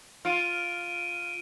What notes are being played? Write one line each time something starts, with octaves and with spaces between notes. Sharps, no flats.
F4 F6 D7 D#7